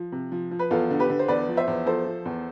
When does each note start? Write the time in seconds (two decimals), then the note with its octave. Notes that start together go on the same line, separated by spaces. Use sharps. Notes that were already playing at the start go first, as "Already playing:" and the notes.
Already playing: F3
0.12 C3
0.32 F3
0.51 F3
0.59 B4
0.71 E2 F4 A4
0.90 D3
0.99 G4 B4
1.09 D3
1.19 C5
1.28 E2 B4 D5
1.48 F3
1.57 C5 E5
1.67 E2
1.86 F3 A4 C5
2.06 F3
2.25 E2